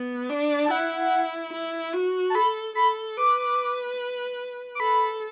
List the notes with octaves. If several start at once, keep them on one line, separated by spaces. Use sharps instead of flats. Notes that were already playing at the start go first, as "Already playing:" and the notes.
Already playing: B3
D4
A5
E4 F#5
E4
F#4
A5
A4 B5
A4 B5
B4 D6
D6
A4 B5